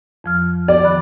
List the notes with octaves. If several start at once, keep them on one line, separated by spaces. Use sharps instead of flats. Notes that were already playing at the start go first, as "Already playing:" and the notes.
F2 F3 F6
D5
D#3 B5 F#6